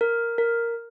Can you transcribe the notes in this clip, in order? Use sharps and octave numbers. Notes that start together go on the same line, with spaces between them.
A#4
A#4